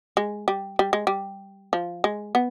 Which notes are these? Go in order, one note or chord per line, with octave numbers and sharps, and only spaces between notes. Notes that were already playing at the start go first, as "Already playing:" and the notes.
G#3
G3
G3
G#3
G3
F3
G#3
B3